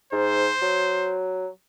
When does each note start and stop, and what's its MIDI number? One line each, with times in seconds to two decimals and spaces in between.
0.13 0.51 44
0.13 1.18 72
0.62 1.48 54